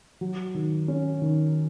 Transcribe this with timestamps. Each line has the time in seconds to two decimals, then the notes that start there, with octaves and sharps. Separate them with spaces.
0.21 F#3
0.55 D#3
0.88 C#4
1.22 D#3